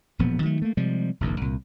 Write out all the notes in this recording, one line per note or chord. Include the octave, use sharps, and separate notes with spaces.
E1 A#2 F3 B3
D#3 F#3 A3
A3 A#3
C3 F3 G3 G#3
F1 A#1 E2 D#3
C2 A#2